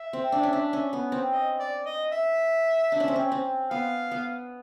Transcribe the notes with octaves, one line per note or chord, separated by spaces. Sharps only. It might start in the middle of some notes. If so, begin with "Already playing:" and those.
Already playing: E5
C4
D4
C#4
D4
C#4
B3
C4
D#5
D5
D#5
E5
D4
C#4
C4
C#4
C4
B3 F5
B3